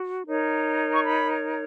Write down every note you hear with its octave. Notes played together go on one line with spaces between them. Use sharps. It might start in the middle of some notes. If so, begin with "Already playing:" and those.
Already playing: F#4
D#4 A#4 C#5
C#6
B5